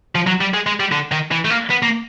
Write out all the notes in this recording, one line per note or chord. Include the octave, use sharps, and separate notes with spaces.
F3
F#3
G3
G#3
G#3
G3
D3
D#3
E3
A3
A#3
B3
A#3